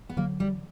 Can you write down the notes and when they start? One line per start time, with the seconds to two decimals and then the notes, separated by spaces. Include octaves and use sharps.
0.09 B3
0.17 D3 F#3 A#3
0.40 G3